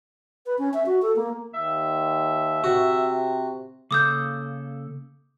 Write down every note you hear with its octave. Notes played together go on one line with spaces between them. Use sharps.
B4
C#4
E5
F#4
A4
A#3
D#2 E5
C3 F#4
C#3 A#3 A4 D6 D#6 G6